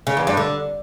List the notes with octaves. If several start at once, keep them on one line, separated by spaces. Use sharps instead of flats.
C#3
E2
G2
D3